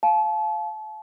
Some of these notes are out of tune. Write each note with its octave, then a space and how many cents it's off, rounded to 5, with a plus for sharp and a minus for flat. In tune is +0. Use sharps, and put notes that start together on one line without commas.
F5 +0 A5 -35